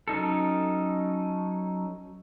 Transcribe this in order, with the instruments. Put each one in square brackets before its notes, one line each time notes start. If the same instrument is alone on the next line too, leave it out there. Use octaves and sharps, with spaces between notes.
[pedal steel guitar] F#3 C#4 D#4 A4